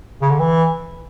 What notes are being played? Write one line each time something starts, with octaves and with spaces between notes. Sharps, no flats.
C#3
D3
E3